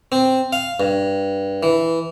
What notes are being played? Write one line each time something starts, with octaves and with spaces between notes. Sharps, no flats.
C4
F5
G2
E3